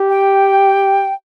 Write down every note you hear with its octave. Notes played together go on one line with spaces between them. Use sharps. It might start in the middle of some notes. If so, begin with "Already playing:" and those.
Already playing: G4
G5